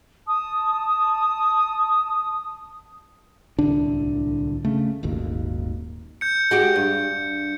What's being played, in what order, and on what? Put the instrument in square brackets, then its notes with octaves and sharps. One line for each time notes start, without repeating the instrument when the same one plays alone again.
[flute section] A5 D#6
[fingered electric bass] D1 C2 D3 D4
C#3 A3
D#1 G#1 D#2
[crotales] G6 C#7
[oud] G#3 F#4 G4
G2